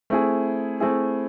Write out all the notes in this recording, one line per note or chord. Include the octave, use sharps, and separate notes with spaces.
A3 C4 E4 G#4
A3 C4 E4 G#4